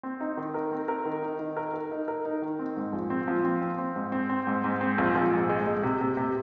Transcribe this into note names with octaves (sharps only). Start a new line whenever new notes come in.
C4
D#4
D#3
A#4
C4
A#4
D#3
D#4
D#3
A#4
A#4
D#4
A#4
D#4
D#3
C4
G#2
A#1
C4
F3
C4
C4
C4
G#2
C4
C4
G#2
G#2
C4
A#1
A#1
G#2
G#3
G#3
C3
C3
C3